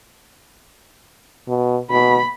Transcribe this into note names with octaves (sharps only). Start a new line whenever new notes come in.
B2
B2 B5